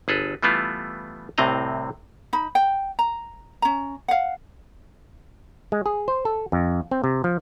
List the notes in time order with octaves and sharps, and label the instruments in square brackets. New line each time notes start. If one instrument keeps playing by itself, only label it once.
[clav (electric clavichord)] G1 G#4 A4 B4
E3 G3 A3 B3 E4 F4
C2 A2 C3 C4 D#5 A#5
[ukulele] D#4 B5
G5
A#5
C#4 A#5
F5 F#5
[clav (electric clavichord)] G#3
G#4
C5
A4
F2
C4
C3
F3